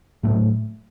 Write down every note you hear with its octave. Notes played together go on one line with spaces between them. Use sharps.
A2 F#3 A3